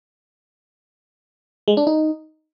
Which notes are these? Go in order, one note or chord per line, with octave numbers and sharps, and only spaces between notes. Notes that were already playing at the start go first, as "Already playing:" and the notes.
G#3
D4
D#4